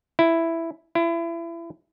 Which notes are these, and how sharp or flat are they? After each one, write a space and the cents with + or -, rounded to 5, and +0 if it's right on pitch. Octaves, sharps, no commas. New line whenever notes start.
E4 +5
E4 +30